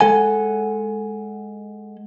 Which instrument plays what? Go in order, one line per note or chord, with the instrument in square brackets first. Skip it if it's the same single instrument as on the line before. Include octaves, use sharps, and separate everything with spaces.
[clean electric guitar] G#3 A4 F#5 G#5